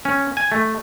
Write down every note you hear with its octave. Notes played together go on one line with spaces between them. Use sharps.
C#4
G#5
A3